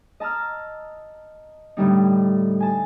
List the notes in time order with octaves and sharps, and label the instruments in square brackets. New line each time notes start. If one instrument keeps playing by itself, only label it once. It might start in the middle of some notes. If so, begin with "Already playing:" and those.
[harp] D#5 A5 A#5 E6 F6
A2 D3 G3 D#4
G#5 A5